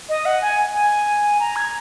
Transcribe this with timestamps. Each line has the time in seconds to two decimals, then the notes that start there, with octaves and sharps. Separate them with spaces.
0.09 D#5
0.25 F#5
0.42 G#5
0.74 G#5
1.40 A#5
1.56 G#6